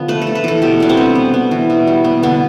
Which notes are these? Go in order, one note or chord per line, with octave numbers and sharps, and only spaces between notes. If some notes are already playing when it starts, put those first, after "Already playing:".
Already playing: D3 F3 B3
A3 B4
A4
A3
B4
E3 A4
B2 G4
G3 D4
C4
B3
B3
B3
E3
B2
G3
B3
D3 B3